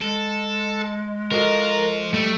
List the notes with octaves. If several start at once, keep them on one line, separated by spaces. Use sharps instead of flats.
G#3 A4
F3 F4 F#4 A4 A#4 D#5
G3 A3